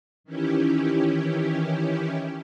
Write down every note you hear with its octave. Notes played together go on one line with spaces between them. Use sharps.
D#3 E3 C#4 E4 G4